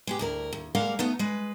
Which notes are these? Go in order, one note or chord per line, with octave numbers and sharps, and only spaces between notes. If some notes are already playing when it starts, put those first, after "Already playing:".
G#3 B3 G4
D2 E4 A#4
D#2
G3 G#3 A#3 A#4 F5 F#5
A3 B3 D#4
G#3 B4